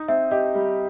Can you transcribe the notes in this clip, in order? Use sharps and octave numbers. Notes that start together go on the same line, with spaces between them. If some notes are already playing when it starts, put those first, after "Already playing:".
Already playing: D#4
C4 E5
G4 D#5
G3